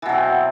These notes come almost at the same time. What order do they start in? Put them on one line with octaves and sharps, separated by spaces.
E3 B2 F#3 C4